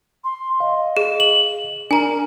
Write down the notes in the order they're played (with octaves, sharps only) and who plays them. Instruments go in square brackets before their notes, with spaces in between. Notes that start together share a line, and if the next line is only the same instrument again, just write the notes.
[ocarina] C6
[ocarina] D#5 [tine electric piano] F5
[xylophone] G#4
[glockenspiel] F#7
[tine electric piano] D4 [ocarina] A#4 [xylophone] G#5 A#5